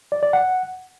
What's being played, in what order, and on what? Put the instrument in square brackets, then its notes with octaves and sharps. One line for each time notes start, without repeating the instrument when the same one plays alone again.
[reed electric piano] D5
D5
F#5